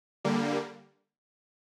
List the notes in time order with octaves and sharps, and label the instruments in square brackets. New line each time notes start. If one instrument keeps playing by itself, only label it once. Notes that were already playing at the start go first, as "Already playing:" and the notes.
[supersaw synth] D3 G3 A#3